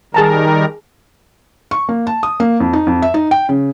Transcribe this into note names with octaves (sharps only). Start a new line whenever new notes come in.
D#3 G3 G#4 A#4 A5 A#5
C#6
A#3
A5
D#6
A#3
F2
D#4
F2
E5
D#4
G5
C#3